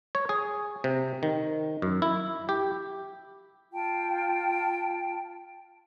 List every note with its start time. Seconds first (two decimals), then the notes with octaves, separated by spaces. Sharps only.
0.15 C#5
0.29 G#4
0.84 C3
1.23 D#3
1.82 F#2
2.02 E4
2.49 G4
3.72 F4 G5 A5